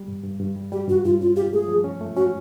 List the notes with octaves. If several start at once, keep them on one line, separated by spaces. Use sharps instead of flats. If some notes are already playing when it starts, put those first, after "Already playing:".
Already playing: G3
G2
G2
G2
G3
G3 G4
G2 F#4
G2 F4
C#4 F4
F4 G4
A3 G#4
F3
C#4
A3
C#4 F#4